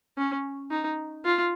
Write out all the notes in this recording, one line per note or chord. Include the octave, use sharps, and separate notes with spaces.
C#4
D#4
F4